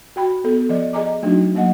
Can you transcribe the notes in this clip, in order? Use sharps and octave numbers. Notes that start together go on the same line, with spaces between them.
F#4 G5 B5
B3 A4
F3 D5 D#5
G#4 D#5 G#5 A#5 D6
F#3 A3 D4 D#4 F#4
F#3 A#3 D#5 F#5